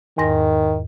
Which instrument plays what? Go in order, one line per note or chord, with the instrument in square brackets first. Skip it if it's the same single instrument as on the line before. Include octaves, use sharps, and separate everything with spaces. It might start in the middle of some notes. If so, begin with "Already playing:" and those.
[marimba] E2 G#2 A#6 [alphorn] D#3